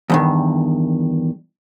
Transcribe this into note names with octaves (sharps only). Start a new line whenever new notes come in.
E2 G2 D#3